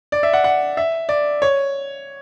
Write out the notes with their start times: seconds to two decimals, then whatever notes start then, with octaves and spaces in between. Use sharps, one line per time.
0.12 D5
0.23 E5
0.33 F#5
0.44 F#5
0.77 E5
1.09 D5
1.42 C#5